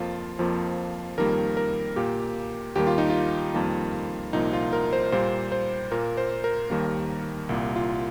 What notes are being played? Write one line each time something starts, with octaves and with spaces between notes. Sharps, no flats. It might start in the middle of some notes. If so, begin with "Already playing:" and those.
Already playing: F2 F3 A#3 F4
F2 F3 A#3
F2 D#3 G3 A#3 A#4
A#4
A#2 A#3 G4
D#2 D#3 G3 A#3 G4
F4
D#4
F4
F2 D#3 G3 A#3
C2 A#2 F3 A#3 D#4
F4
A#4
C5
A#2 G3 A#3 C5
C5
A#2 A#3 A#4
C5
A#4
D#2 D#3 G3 A#3
C2 A#2 A#3
F4